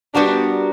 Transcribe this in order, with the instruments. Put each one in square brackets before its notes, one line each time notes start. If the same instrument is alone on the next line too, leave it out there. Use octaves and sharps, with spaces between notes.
[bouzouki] G3 B3 F#4 A#4 [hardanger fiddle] D4